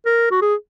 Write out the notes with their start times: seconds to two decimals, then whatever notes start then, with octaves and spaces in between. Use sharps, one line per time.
0.06 A#4
0.31 F#4
0.42 G#4